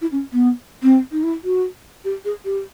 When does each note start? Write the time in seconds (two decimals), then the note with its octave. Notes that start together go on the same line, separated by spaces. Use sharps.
0.02 E4
0.12 C#4
0.33 B3
0.83 C4
1.12 D#4
1.23 E4
1.44 F#4
2.05 G4
2.25 G#4
2.45 G4